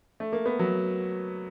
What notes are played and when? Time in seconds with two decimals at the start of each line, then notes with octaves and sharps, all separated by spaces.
0.20 A3
0.32 A#3
0.46 B3
0.59 F#3